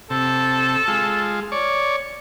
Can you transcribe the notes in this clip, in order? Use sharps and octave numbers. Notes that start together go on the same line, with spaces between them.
C3 A4
G#3 F4
C#5 D5